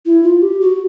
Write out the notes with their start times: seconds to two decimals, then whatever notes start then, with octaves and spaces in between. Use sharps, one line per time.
0.06 E4
0.24 F4
0.42 G4
0.61 F#4